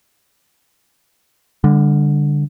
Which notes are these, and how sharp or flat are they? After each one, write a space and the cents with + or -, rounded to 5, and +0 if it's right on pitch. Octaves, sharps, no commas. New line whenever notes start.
D3 +0 G3 +40